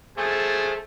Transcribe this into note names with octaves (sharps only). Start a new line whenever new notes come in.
A3 G#4 C5 A5